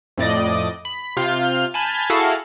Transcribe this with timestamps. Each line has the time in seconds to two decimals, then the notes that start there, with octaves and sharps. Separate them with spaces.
0.17 F2 A2 D5 D#5
0.85 B5
1.16 C3 F4 F5 F6 G6
1.74 G#5 A5 B5 F6 G6
2.10 E4 F#4 G#4 A4 F5